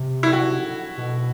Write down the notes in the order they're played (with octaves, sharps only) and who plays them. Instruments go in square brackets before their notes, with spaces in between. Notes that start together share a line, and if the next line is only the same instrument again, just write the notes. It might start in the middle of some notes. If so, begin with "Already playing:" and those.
Already playing: [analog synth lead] C3
[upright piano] E4
F#4
[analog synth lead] B2